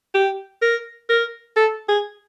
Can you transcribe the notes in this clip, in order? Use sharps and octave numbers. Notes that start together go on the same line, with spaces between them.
G4
A#4
A#4
A4
G#4